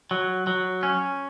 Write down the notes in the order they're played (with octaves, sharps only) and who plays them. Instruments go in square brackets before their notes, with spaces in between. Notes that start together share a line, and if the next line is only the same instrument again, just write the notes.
[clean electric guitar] F#3
F#3
C#4